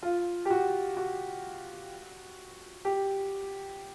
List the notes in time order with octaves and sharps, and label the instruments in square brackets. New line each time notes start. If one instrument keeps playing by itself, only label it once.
[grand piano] F4
G4
F#4
F#4
G4